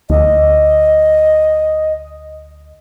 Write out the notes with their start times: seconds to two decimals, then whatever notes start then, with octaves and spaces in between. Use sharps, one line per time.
0.10 D2 D#5